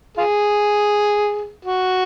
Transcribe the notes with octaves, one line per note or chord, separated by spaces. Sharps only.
F4 G#4
F#4